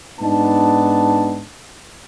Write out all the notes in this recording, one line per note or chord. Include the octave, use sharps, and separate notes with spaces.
G#2 B3 D4 D#4 A5